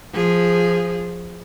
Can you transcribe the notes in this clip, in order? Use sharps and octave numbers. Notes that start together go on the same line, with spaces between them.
F3 G#4